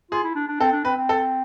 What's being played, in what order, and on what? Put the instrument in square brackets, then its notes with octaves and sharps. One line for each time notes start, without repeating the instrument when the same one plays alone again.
[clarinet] F4 [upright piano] G#4
[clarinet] E4
D4
D4
[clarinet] C4 [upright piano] A4
[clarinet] D4
[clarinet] C4 [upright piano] B4
[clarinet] C4
[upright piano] A4